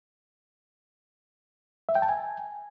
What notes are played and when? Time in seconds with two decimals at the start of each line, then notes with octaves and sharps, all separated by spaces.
1.89 E5
1.95 G5
2.02 A5
2.09 G#5